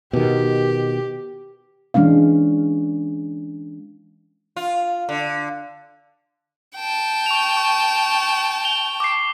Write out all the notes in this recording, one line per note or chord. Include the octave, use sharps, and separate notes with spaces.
B2 D#3 G4
E3 G#3 C#4 D4 F5
F4
D3
G5 A5
C#6 F7
C#6
F7 G7
D6 C7